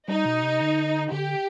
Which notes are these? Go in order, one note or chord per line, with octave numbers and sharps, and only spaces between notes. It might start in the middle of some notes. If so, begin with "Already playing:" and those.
G3 D#4
B2
C3
D3
D3 G4